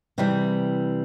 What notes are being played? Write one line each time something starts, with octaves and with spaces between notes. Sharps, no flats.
C3 E3 G3 C4